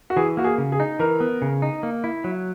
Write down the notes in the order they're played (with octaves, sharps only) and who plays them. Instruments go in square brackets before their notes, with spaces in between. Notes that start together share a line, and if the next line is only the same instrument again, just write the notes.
[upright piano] F#4
[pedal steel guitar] E3 [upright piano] G#4
[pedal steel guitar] A#3 [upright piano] F#4
[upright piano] G#4
[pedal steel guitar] C#3
[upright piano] G#4
[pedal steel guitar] D#4
[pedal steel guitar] E3 [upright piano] A#4
[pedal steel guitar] B3
C#3
D#4
A#3
E4
F#3